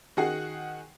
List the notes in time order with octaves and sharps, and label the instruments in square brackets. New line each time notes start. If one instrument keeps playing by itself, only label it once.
[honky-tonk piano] D#3 F#4 G#4 F#5 C7